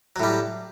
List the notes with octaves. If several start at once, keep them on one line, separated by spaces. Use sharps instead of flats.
A2 F#3 G3